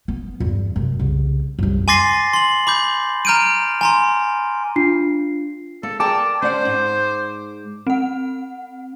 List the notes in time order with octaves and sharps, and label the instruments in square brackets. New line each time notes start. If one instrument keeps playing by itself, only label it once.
[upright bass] B3
E2 G2
F#2 C3
C2 C#3
C2 F#2
[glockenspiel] G#5 C6 D6 A6 A#6 C7
C6 F#7
B5 D6 G6
A#5 F6 G6 D7 D#7
G#5 A#5 C6
[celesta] D4 F4 C7
[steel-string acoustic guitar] A#3 [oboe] A4
[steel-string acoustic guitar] A#4 G5 A5 [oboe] D5 [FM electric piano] D6
[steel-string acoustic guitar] C#4 D5 F#5 [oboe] C5
[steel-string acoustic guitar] G#2
[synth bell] C4 F#5